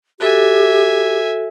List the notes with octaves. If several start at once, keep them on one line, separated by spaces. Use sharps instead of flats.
F#4 G4 A4 E5 G#5